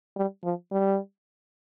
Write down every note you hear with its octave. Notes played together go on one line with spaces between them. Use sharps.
G3
F3
G3